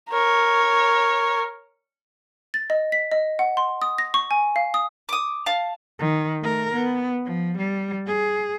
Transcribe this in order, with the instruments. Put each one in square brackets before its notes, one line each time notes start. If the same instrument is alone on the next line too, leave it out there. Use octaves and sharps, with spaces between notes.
[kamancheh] A#4 C#5
[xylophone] A6
D#5
B6
D#5
F#5
C6
D#6
A#6
C#6
G#5
F5
D#6
[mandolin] D6 D#6
F5 A5
[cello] D#3
A3 A#4
B3
F3
G3
G#4